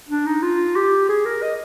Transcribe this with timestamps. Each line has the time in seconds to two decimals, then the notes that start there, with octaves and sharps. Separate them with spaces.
0.09 D4
0.26 D#4
0.42 F4
0.75 G4
1.09 G#4
1.25 A#4
1.42 D#5